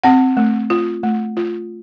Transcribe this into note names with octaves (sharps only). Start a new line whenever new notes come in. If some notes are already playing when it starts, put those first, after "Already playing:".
C4 F#5
A3
F4
A3
F4